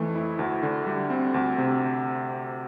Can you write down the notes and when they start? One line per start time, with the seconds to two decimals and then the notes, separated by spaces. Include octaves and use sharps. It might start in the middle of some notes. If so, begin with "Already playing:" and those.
Already playing: F2 E3 A3
0.16 E4
0.39 D2
0.63 D3
0.86 G3
1.10 C4
1.34 D2
1.58 C3